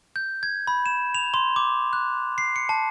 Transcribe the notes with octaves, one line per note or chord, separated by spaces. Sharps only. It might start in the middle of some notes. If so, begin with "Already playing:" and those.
G6
G#6
B5
E7
F7
C6
D6
F#6
C7
C#7
A5